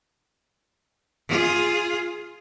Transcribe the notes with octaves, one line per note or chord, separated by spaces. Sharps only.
F4 G#4